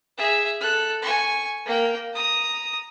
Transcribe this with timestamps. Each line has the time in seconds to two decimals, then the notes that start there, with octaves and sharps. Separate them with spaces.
0.17 G#4 E5
0.60 A4 F#6
1.02 G#5 C#6
1.66 A#3 G5
2.14 A#5 D#6